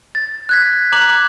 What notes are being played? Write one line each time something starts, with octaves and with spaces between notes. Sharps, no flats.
A6
F#6 G#6 B6
A#5 D6 F#6 F#7